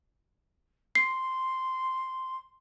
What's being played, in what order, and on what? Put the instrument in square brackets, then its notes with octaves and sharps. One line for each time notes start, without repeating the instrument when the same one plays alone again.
[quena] C6 [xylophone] C7